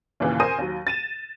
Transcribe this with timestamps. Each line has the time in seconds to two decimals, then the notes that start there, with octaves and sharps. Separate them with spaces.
0.20 D#2 A#2 C#3 E3
0.40 A#4 C5 G#5 D#6 A#6 D#7
0.58 D#2 F#3
0.87 A6 D#7 E7